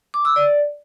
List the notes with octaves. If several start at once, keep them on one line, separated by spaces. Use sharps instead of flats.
D6
E6
D5